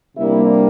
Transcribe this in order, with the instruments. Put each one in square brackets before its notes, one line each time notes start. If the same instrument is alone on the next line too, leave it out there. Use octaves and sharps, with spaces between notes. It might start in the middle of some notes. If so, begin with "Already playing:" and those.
[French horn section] C3 G3 A#3 D4 E4